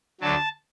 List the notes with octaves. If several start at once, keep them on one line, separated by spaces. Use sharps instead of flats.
D2 D3 F#3 A5